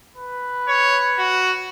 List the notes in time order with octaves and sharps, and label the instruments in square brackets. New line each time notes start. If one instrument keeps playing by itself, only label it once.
[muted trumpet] B4
[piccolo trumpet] C#5
F#4